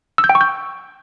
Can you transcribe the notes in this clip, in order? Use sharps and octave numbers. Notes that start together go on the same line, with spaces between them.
E6
G6
G5
C#6
G6